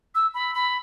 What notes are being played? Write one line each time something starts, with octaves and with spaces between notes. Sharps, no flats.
E6
B5
B5